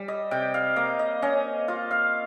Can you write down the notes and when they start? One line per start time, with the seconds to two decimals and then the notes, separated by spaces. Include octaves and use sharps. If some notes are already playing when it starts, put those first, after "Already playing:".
Already playing: G3
0.08 D#5
0.31 C3 G5
0.54 F5
0.76 A#3 D#5
0.99 D#5
1.22 C#4 D#5
1.68 F4 D#5
1.91 F5